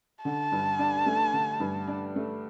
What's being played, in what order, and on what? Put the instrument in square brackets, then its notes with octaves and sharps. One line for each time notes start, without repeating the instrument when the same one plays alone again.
[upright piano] D3 [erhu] A5
[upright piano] G2
D4
A3
D3
G2
D4
A3